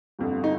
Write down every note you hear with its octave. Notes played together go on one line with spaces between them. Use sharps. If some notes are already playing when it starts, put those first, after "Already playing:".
G1 F2 D3
D#4